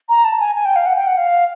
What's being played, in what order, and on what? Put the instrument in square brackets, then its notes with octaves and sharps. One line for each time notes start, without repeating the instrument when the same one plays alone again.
[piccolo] A#5
A5
G#5
G#5
G5
F5
F#5
G5
F#5
F5